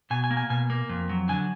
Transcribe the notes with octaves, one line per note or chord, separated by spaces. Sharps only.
B2 G#5
G#5
A#3
G#5
B2 G#5
A#3
F2
F#3
D3 G#5